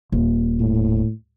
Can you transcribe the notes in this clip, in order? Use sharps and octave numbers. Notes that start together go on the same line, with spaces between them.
D#1
A2